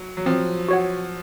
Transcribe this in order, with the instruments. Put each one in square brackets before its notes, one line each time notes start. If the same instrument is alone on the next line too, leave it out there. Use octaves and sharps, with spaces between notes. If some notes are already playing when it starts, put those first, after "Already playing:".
Already playing: [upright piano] F#3
F#3
[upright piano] F3 [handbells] C4
[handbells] F#4 C#5 F#5